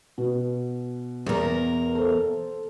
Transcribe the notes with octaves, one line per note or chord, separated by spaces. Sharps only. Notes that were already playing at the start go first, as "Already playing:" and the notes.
B2
E2 A#4
A4 C5